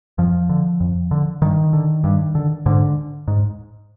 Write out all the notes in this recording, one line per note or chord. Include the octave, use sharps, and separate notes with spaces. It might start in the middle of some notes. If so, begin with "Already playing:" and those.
F2 F3
D3
F2
D3
G2 D#3
D3
G2
D3
G#2 D3
G#2